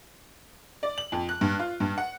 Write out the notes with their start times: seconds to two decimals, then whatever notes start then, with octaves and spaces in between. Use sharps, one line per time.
0.83 D5
0.98 F#7
1.12 F2
1.29 F#6
1.41 G2
1.59 F4
1.80 G2
1.98 F#5